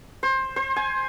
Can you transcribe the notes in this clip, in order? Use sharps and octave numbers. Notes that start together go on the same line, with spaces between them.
C5
C5
G#5